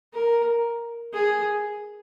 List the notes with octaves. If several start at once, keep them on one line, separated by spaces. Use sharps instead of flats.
A#4
G#4